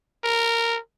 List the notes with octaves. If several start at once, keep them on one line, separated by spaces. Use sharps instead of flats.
A#4